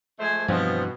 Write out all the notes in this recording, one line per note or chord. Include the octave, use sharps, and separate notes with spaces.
F3 G#3 A3 C5 G#5
G2 B2 E3 F3 B3 C4 D#5